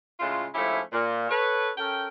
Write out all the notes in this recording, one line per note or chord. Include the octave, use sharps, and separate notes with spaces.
A2 C#3 G#3 A3 F4
G#2 F3 A3 C#4 E4 G4
A#2
A4 B4 C#5
C#4 A4 A#4 G5